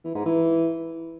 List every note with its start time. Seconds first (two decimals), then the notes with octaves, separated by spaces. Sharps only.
0.05 E3
0.15 G#2
0.26 E3